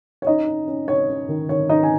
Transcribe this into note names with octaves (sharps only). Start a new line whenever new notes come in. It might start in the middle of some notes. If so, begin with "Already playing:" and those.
C#5
C#4 D#4 D#5
C#4
C#4
C#4 C#5
C#4
D#3
D#3 C#5
C#4 D#4 D#5
G#5